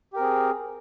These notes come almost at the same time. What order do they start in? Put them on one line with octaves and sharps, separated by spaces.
G4 A#4 C4 G#4